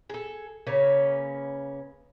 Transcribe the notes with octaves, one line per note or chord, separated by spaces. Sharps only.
G#4 A4
C#3 A#3 C#4 B4